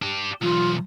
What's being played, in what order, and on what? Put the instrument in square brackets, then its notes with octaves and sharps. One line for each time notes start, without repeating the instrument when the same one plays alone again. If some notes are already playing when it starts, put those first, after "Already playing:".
[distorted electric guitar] D4 G4
[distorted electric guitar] B1 E2 [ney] F4